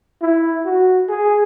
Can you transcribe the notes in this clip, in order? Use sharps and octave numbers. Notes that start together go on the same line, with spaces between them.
E4
F#4
G#4